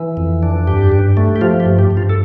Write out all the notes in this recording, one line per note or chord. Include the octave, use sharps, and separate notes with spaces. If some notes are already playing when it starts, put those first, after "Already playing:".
Already playing: E3
F2
D4
G2 G4
G2
A3
G4
F3 F4
G4
G2
G4
G2
F4
A4